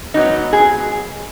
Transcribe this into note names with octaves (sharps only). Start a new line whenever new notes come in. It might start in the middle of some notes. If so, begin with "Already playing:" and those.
G#2 F#3 B3 D#4
G#4